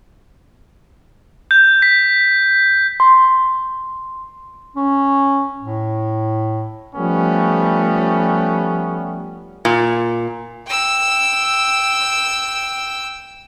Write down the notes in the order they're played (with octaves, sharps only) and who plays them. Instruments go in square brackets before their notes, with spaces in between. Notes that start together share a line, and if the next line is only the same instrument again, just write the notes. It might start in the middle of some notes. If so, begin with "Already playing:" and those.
[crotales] G6
B6
[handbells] C6
[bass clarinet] C#4
A2
[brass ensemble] F3 G3 A3 B3 C#4
[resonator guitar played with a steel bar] A#2
[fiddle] G5 E6